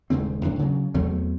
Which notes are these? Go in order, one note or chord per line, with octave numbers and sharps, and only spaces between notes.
D#1 G#2 C#3 C4
C#2 A2 D4
C#3 F#3
E2 F#3 A3 C4